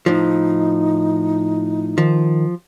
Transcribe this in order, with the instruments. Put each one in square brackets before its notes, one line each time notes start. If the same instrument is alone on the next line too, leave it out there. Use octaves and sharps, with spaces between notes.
[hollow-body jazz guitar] A2 F3 [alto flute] D#4
[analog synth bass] D#3 [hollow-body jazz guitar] F3